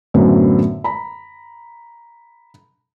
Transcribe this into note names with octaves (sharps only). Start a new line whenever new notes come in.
F#2 A2 D3 A3 B3 C4
A#5 B5